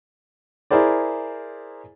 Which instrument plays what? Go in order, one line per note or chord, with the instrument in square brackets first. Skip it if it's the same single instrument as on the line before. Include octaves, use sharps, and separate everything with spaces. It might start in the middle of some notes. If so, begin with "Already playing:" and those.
[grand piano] E4 G#4 A#4 C5 D5